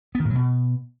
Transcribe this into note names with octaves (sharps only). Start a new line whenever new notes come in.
B3
D#3
A2
F#3
B2